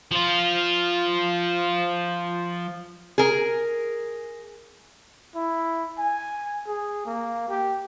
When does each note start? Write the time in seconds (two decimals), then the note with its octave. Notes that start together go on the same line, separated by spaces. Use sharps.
0.11 F3 F4
3.18 G#4 A#4
5.35 E4
5.98 G#5
6.67 G#4
7.06 A#3
7.49 G4